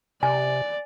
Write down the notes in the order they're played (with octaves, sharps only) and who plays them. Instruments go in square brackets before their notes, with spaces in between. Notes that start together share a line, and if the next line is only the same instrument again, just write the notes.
[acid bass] C3 [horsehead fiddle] D5 [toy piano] G#5